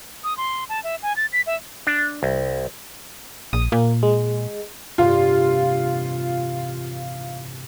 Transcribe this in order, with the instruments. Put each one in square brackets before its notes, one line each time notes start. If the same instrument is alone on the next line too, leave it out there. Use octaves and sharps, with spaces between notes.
[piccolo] D#6
C6
A5
E5
G#5
A6
B6
E5
[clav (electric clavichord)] D4
C2
[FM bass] A#1 [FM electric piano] D#6
[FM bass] A#2 [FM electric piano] A#3
[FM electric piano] G#3
[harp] A1 G2 C3 [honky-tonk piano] F4